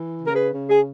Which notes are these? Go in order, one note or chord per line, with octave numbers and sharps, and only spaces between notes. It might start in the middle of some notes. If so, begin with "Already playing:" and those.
Already playing: E3
C#3
A#4
G#4 B4
C#3
G#4